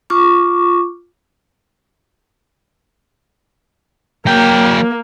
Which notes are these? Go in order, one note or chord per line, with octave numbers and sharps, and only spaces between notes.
F4 C#6 D6
F#3 A#3 G5